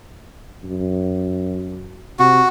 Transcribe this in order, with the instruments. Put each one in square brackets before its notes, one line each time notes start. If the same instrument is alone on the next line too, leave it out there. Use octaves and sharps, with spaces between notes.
[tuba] F#2
[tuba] C3 [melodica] F#4